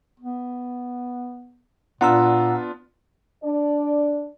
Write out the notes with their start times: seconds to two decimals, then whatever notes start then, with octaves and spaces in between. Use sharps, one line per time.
0.20 B3
2.01 A#2 B3 D4 F4 F#5 A#5 E6
3.44 D4 D5